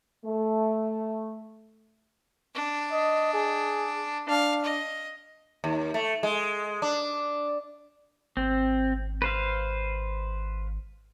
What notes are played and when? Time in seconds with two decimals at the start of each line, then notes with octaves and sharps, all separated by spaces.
0.25 A3
2.54 D4
2.92 D#5
3.34 G#4
4.29 D4 F5
4.64 D#5
5.64 D#2
5.94 A3
6.23 G#3
6.82 D4
8.37 G#1 C4
9.22 B4 C5 F5